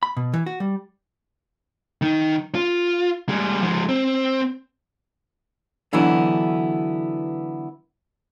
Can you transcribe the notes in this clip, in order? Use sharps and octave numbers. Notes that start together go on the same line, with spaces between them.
B5
B2
E3
F#4
G3
D#3 D#4
F4
G3 G#3
F3 G#3
C4
D3 E3 F#3 B3 D4 E4